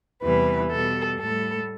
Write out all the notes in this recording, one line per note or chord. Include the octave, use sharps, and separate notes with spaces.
E2 C3 E3 G3 B4
B2 G3 A4
A2 G3 A4